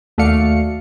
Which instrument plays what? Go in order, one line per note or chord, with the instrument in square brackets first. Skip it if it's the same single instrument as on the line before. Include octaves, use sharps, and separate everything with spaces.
[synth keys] D#2 A3 F#4 D5 F5 C#7